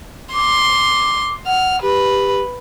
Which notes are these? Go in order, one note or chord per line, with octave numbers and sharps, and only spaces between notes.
C6 D6
F#5 F6
G4 B4